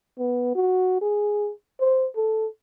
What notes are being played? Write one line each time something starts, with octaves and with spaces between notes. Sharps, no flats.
B3
F#4
G#4
C5
A4